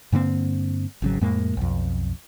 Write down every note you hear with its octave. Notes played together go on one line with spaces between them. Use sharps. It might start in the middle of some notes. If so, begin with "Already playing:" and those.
G2 D3 A#3 C4
G#1 C#3 F#3
F2 A2 G#3 A#3
B1 F2